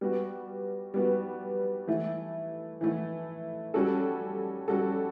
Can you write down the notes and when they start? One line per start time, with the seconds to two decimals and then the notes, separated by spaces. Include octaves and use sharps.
0.01 G3 B3 F#4
0.94 G3 B3 F#4
1.87 E3 A3 E4
2.81 E3 A3 E4
3.74 G3 C#4 F#4 A4
4.68 G3 C#4 F#4 A4